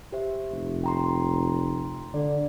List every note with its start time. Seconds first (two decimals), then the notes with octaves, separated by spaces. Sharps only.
0.12 G4 C5 E5
0.51 F1
0.84 G5 A#5 C6
2.14 D3 D5